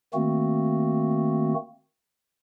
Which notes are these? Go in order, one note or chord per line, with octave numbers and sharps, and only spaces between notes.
D#3 A3 A#3 C4 F#4